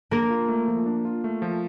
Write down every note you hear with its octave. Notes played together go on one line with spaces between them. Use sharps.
A#3 D4 A#4
F4
A3
F3
D4
F4
A3
F3